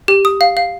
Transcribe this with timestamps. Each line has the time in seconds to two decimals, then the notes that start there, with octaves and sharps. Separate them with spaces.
0.08 G4
0.25 D#6
0.41 F5
0.57 F5